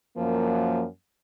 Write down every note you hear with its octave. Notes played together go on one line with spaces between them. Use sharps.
F#2 F3 A#3